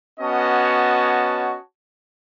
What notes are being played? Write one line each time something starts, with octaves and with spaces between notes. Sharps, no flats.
B3 C#4 F#4 C#5 D#5 A5